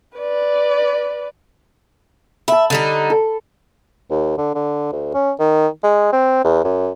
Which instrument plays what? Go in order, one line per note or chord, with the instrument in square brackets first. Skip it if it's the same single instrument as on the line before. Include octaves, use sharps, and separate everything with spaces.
[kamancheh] B4 D5
[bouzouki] E5 [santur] A5 B5
[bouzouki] D3 G3 D#4
[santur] A4
[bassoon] D#2
D3
D3
D2
C#4
D#3
G#3
C4
E2
F#2